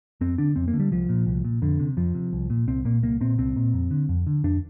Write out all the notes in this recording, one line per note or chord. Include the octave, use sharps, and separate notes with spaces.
F2 C4
D3 D4
F2 C4
A#3
D3
G3
C2 F3
A#2
C2
A#2
F2 D3
C3
F2 F3
C3
C2
A#2
C2 C4
A#2 A#3
C2 A#3
A#2 C4
C2 C4
A#2
F2
D3
F2
D3
F2 D4